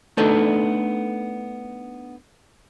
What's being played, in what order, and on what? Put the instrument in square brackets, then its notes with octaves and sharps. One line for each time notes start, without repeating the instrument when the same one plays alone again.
[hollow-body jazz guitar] A3 B3 D4 D#4 A4